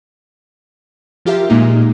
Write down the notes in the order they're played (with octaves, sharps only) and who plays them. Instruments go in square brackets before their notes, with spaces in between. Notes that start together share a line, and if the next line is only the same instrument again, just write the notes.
[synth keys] F3 F4 G4 A#4 E5
A#2 G#3 A#3 D#4